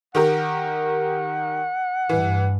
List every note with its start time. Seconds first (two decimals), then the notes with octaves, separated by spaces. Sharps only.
0.15 D#3 G4 A#4 F#5
2.09 G2 E3